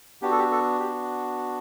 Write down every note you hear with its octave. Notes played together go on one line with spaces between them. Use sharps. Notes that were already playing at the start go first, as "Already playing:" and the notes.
B3 D4 F#4 G4
A4
G4
A4
G4